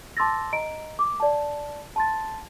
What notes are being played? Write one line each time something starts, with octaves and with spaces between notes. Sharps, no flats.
A5 C6 D6 E6 A6 A#6
D#5 A#5 D7
D6
D5 A5
A5 C6 A6